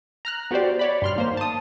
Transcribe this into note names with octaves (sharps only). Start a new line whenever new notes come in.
A#5 F6 F#6
B3 F#4 G4 C5 D5
C#5 D5 B5
G2 C6 F6
D#3 A#3 C5
A5 D#6